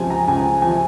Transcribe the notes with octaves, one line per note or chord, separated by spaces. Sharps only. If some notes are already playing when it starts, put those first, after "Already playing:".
Already playing: C#2 C3 F3 C4 G#5
A#5
C#2 G#5
C3 F3 C4 G#5